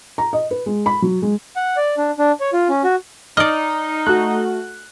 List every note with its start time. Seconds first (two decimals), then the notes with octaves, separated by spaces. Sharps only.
0.18 A#5
0.33 D#5
0.51 B4
0.66 G#3
0.86 B5
1.02 F#3
1.22 G#3
1.56 F#5
1.77 D5
1.98 D4
2.19 D4
2.40 C#5
2.53 F4
2.69 C#4
2.84 F#4
3.37 D#4 D5 D#5 F6
4.07 A3 F#4 F#6